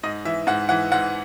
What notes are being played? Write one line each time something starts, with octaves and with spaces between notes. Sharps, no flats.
G#2 D#5
E3 E5
G#2 F#5
E3 F#5
G#2 F#5